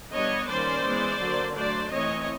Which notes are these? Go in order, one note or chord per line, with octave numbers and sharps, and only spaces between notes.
G3 B3 D4 C#5 D#5
D#3 G3 A#3 C#4 C5 D5
E3 G#3 B3
D3 F#3 A#3
F#3 A3 D4 C5 D5
E3 A3 C4 C#5 D#5